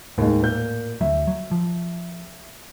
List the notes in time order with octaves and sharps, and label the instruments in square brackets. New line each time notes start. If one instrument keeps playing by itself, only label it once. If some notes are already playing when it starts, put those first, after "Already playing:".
[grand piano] D#2 G#3 [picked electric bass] A2
[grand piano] A#2 A#3 G6
[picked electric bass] D2 F#3 [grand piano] E5
[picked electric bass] F#3
F3